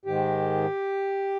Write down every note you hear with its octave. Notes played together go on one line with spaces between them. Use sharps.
G#2 D#3 G#3 G4